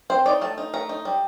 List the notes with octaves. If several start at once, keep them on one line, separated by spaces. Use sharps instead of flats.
C4 C5
D#4 D5
A3 A5
D#4
A3 A#5
D#4
G3